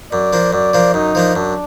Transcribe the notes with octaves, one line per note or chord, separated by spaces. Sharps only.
F#2 D5
F3 A#3 D4
F#2 D5
F3 A#3 D4
F#2 D#4
F3 A#3 D4
F#2 D4